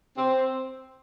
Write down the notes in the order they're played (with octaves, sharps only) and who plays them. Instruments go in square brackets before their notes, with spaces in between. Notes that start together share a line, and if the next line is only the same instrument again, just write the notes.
[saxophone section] C4